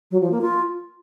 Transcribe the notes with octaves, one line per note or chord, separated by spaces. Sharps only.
F#3
F3
A#3
F4